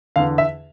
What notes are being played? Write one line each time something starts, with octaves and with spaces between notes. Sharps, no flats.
E2 D3 F5
E5